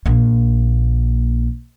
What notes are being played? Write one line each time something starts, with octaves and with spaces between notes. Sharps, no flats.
A#1 A#3